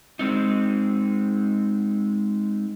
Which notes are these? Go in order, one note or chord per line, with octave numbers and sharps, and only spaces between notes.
G#3 C4 D#4